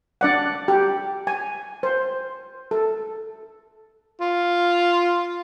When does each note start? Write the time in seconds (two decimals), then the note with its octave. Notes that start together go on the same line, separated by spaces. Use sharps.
0.21 D4 D5 F#5
0.68 G4
1.27 G#5
1.83 C5
2.71 A4
4.20 F4